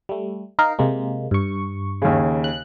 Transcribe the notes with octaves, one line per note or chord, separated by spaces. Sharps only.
G3 A3
D#4 A#4 F5
C3 G#3 A#3
G2 C#6
D#2 C#3
F#6